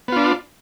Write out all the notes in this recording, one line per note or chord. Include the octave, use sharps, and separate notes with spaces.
B3 D4 F4